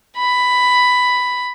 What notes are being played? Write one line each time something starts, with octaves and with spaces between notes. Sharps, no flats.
B5